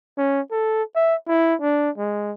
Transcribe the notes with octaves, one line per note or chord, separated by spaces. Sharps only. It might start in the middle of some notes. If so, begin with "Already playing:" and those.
C#4
A4
E5
E4
D4
G#3